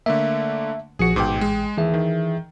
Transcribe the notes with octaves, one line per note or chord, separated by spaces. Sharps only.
D3 A3 A#3 E5
A#1 F3 F#4 G#4 C#7
A1 G#2 B2 G5 D6
G#3
D#2 E3 G#4 E5
D#3